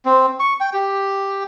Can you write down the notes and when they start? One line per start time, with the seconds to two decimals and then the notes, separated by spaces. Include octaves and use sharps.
0.05 C4
0.40 C#6
0.61 G5
0.73 G4